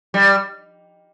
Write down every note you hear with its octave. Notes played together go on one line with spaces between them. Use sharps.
G3